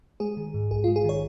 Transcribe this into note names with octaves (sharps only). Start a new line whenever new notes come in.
G#3 G#4
D#3
G#2
A#1 G#4
F4
G#3
G#4
D#3 C#5